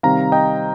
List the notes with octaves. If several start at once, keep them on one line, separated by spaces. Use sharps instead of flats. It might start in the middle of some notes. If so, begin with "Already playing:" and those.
C3 D#3 G3 C4 F5 A#5
D#5 G5